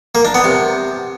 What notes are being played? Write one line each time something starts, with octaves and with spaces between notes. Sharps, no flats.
A#3
D4
B3
C3